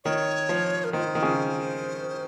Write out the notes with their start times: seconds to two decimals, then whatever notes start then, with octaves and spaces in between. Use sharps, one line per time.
0.04 D#3 C#5
0.49 F3
0.84 A#4
0.93 D#3 C5
1.15 D#3
1.23 C#3